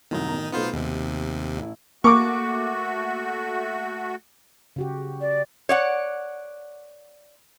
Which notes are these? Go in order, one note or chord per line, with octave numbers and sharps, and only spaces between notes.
C2 F#2 A2 D#3 D#4
A1 B2 A#5
B1 A3 B3 D#4 F4 C5
D#2 C3
A1 E4
A3 A#3 F#4 C#6 D6
C#3 F#4 G4
D5
C#5 D5 F#5